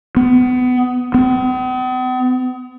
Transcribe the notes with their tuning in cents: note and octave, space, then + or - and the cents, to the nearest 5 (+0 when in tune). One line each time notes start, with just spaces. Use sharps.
B3 +25
B3 +45